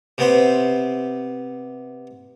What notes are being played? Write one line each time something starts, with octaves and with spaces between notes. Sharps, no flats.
C3 B3 C5